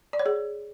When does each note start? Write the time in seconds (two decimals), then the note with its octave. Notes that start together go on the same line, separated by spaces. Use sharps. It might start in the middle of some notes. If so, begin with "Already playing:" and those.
0.13 D5
0.19 C#5
0.26 G#4